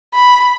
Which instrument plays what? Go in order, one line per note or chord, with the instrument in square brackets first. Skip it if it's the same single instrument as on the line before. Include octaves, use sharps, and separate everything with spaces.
[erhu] B5